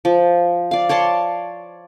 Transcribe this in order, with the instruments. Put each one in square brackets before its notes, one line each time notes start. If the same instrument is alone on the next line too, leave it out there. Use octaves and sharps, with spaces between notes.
[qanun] F3
D5 F5
C#5 D5 A5 C6